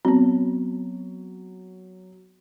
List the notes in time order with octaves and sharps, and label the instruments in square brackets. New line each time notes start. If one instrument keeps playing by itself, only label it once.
[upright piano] F#3 [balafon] B3 C4